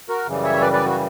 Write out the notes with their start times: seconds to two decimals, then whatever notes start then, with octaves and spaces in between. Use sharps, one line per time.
0.09 F#4 A#4
0.26 F#2 C#3 E3 G3
0.44 C#5 E5
0.61 B4 D5
0.73 B4 D5
0.84 F#4